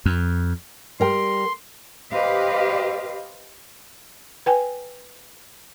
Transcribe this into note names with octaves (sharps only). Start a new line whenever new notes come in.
F2
G3 A#4 G5 C6
G4 B4 C5 D#5 F5
B4 G5 G#5